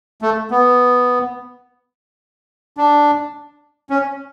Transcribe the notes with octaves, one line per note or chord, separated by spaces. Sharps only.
A3
B3
D4
C#4